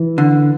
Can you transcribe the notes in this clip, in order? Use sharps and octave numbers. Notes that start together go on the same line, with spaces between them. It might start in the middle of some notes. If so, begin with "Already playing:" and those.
Already playing: E3
D3